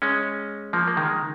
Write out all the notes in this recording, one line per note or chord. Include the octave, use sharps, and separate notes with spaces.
G#3 C#4
F3 A#3
A#3
D#3 G#3